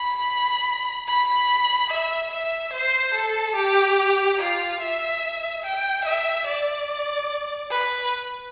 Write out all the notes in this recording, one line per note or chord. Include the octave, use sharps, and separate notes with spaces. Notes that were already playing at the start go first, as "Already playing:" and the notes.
Already playing: B5
B5
E5
E5
C5
A4
G4
F4
E5
G5
E5
D5
B4